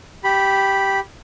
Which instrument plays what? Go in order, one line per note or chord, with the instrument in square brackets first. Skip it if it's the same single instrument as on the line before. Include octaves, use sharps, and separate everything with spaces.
[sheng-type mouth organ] G4 B5